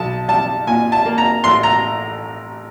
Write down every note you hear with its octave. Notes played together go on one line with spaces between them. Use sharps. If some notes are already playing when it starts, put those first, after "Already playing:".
Already playing: B1 A5
G3 A5
A#2 G#5
A5
A#3
A#5
A1 C6
A#5